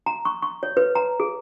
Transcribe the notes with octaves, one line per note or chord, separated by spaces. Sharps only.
A#5
C#6
C#6
C#5
B4
A#5
G#4